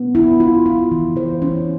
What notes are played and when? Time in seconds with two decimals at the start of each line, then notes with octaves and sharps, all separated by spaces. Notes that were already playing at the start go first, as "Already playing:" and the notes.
Already playing: B3
0.15 E4
0.40 F4
0.66 F4
0.92 E3
1.16 E3 C5
1.42 C#4